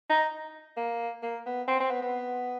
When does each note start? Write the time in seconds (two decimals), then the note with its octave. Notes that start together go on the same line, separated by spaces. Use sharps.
0.09 D#4
0.77 A#3
1.23 A#3
1.46 B3
1.68 C4
1.80 C4
1.90 B3
2.02 B3